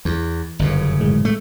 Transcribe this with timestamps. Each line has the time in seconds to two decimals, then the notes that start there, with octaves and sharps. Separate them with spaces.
0.05 E2 E3
0.59 G1 F#2 C#3
1.00 A2 E3 G#3
1.25 A3